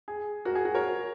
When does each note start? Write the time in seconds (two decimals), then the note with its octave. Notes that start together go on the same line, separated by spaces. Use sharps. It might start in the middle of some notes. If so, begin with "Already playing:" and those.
0.08 G#4
0.45 F#4 A#4
0.55 G#4
0.65 F#4
0.75 A#4 C#5